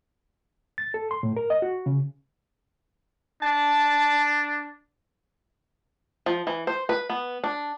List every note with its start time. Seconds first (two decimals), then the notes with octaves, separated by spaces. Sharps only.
0.78 A6
0.94 A4
1.11 C6
1.23 A2
1.37 A#4
1.50 D#5
1.62 F#4
1.86 C#3
3.42 D4 A5
6.26 F3
6.47 E3
6.67 C5
6.89 B4
7.10 B3
7.44 D4